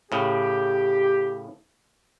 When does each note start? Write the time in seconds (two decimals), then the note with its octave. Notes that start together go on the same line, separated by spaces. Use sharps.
0.12 A2 C#3 G4